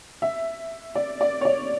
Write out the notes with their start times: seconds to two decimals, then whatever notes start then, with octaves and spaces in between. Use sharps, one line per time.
0.22 E5
0.95 D5
1.21 D5
1.41 C#5
1.45 D5